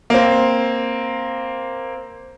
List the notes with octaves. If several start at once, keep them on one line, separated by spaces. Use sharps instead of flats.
A#3 C4